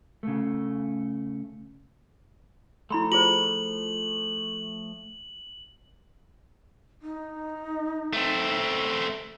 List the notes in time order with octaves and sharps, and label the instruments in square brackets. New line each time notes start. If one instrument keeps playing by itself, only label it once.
[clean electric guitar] C#3 A3
[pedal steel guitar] F3 A3 [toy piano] E4 B5 C6
[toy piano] F4 G#4 C5 [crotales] F#7
[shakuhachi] D#4
[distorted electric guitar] A3 C4